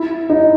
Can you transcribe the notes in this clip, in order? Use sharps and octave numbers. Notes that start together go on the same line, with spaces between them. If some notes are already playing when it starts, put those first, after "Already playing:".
Already playing: E4
D#4